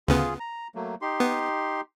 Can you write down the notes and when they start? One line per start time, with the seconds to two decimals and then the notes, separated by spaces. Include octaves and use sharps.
0.08 D2 C#3 B3 F4 G#4
0.40 A#5
0.75 F#3 A3 A#3
1.02 D#4 G4 C6
1.20 B3